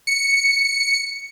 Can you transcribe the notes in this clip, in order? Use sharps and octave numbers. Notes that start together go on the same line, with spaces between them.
C#7